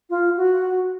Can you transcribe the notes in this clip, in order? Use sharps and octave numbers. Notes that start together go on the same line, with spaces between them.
F4
F#4